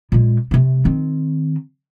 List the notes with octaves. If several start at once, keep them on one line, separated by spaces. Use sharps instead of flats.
A#2 G#3
C3 A3
D#3 C4